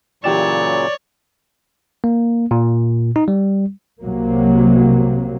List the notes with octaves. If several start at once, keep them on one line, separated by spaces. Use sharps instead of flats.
A#2 C#3 E3 F#3 G4 C#5 D5 E7
A#3
A#2
D#4
G3
C2 C3 F#3 A#3